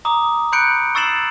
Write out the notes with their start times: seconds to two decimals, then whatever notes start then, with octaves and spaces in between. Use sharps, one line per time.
0.05 A#5 D6 D#6
0.52 B5 F#6 G6 C#7 D7
0.95 C#6 E6 A6 C7 E7 F#7